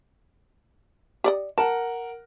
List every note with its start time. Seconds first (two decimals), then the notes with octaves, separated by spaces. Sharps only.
1.24 G4 D5 D#5
1.58 A#4 F#5 A5